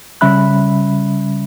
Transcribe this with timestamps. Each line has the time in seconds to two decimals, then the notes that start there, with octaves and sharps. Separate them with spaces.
0.21 C#3 G3 C#4 E5 B5 F#6